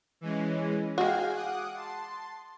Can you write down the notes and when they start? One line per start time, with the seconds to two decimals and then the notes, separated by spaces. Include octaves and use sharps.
0.21 E3 G#3 C#4
0.98 G#3 F#4 F5 G5 G#5
1.32 F#5 D6 D#6
1.74 A5 C6